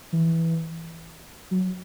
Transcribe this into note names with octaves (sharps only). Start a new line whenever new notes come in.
E3
F#3